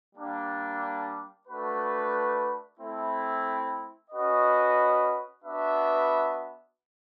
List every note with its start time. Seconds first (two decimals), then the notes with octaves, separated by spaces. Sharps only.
0.14 G3 A#3 D4
1.46 A3 D4 F#4 B4
2.79 A3 C4 E4
4.10 C#4 F#4 B4 D#5
5.43 B3 D4 F#4 B4 E5